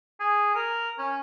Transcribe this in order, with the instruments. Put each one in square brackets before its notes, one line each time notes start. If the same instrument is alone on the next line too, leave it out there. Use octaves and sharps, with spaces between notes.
[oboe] G#4
A#4
C#4